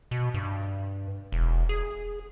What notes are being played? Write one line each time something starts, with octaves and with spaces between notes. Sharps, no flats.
B2
G2
E1
G#4